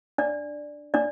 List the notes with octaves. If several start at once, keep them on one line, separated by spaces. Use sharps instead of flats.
D4 D5
D4 D5